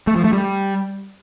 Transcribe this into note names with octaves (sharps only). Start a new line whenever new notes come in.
A3
F3
A3
G3